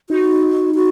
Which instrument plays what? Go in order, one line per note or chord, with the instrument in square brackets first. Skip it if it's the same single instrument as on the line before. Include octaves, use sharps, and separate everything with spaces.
[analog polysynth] D#4 [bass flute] F#4
[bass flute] F#4